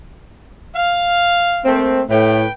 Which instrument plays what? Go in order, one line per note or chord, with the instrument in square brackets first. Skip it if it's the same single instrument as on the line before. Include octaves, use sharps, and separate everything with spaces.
[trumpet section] F5
[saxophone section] A3 A#3 C4
[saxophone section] A2 [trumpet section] B4 G5